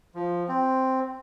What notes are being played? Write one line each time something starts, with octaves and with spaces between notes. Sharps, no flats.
F3
C4